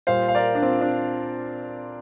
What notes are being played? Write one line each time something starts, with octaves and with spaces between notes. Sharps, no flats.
A#2 G3 C5 F5
F5
A#4 D5
D4
C4 F4
D4